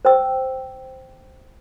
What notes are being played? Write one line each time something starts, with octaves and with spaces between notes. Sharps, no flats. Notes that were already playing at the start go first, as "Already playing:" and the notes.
C5 G5 E6